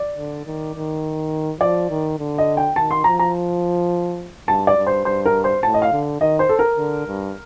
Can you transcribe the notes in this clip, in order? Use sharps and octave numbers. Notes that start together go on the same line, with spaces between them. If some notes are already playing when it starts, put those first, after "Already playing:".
Already playing: D5
D3
D#3
D#3
F3 D5
D#3
D3
D#5
G5
D#3 A5
C6
F3 A#5
A#5
G2 A5
D5
G2
C5
G2 C5
A#4
C5
A2 A5
D#5
F5
D3
D#3 D#5
C5
A4
A#4
D3
G2